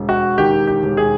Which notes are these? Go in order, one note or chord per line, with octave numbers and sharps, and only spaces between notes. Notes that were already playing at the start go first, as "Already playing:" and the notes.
Already playing: E1
F#4
D#3 G4
G4
E1
G#4